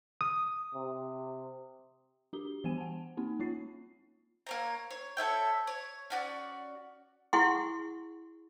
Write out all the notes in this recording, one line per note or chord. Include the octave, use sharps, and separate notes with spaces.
D#6
C3
D4 F#4 G4 G7
E3 B3 C5 G#5 D#7
F#5 A5
A#3 C4 D#4
A#3 C#4 F4 C#5 C7
A#3 C#5 A#5
C#5
A4 C#5 E5 G5
C#5
C#4 F#4 D5
E4 G#4 F#5 C6 C#6